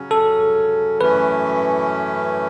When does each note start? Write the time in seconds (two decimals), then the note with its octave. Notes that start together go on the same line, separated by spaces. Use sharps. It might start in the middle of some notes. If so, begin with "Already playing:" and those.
Already playing: C#3 F#3 C#4
0.11 A4
1.01 F#2 E3 A3 C#4 B4